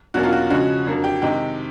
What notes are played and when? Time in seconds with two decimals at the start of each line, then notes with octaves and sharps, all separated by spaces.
0.14 E2 B2 F#3 A#3 C#4 F#4
0.23 F4
0.32 F#4
0.50 C#3 F3 G#3 C#4 F#4
0.86 F2 D3 F#3 A#3
1.04 G4
1.22 C3 D#3 G#3 G4